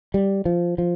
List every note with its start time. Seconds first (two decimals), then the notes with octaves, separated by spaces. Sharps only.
0.14 G3
0.45 F3
0.78 F3